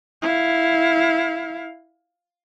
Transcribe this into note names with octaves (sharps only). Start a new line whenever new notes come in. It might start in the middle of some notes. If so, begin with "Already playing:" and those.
E4 F5